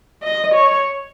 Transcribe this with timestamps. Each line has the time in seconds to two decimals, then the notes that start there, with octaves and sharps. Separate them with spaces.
0.23 D#5
0.54 C#5